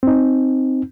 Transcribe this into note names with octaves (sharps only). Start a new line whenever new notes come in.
C4 D#4